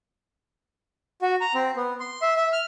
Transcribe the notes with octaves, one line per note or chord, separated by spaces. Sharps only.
F#4
A#5
C4
B3
C6
E5
E5
F6